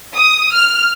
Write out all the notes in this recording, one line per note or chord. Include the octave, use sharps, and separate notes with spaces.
D#6
F6